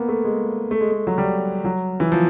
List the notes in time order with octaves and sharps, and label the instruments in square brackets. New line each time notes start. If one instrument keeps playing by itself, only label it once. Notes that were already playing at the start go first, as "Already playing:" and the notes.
Already playing: [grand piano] A#3 B3
A3
G#3
A3
G#3
A3
F#3
G3
F#3
E3
F3